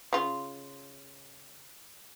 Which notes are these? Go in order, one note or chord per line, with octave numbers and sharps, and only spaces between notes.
C#3 F4